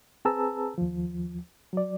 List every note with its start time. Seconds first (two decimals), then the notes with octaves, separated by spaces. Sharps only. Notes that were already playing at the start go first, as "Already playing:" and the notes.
0.25 C4 G#4 B4 A5 A#5 E6
0.78 D#2 F3
1.73 F#3 D5